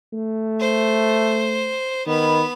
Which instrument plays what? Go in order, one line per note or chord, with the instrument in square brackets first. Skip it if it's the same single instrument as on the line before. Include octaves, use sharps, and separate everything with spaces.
[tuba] A3
[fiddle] C5
[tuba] D#3 [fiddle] B3 B5